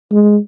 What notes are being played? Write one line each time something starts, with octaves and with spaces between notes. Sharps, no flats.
G#3